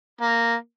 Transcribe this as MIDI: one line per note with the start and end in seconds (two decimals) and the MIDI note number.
0.21 0.54 58